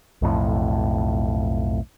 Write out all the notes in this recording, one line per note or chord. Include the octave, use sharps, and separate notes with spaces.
B1 F2 A2